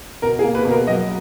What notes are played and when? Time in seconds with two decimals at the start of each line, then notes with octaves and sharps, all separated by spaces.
0.22 B2 A#4
0.39 G#4
0.44 A#3
0.55 B4
0.65 B2
0.71 A#4
0.87 F#3 D#5